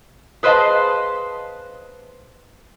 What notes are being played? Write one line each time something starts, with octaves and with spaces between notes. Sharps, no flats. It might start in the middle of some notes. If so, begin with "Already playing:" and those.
G#4 B4 C5 D#5 F5 A5